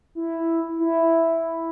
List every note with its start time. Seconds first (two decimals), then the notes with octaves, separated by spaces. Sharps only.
0.15 E4
0.78 E4